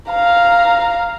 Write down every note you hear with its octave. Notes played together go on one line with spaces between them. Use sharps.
F5 A#5